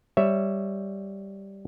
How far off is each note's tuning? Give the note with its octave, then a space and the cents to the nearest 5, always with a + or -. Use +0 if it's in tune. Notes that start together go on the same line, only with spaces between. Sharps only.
G3 +0 C#5 +0 E5 +0